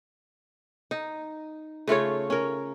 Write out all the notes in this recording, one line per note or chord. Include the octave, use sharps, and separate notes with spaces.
D#4
C#3 A3 F4 C#5
C#4 A#4